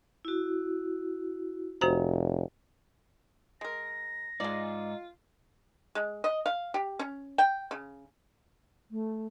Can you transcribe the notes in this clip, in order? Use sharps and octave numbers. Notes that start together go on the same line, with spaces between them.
E4 F#4
F1 F#4 C5 A#5
G#3 A#4 A#6
G#2 G#3 D#4 F4 D5
G#3
D#5
F5
G4
C#4
G5
C#3
A3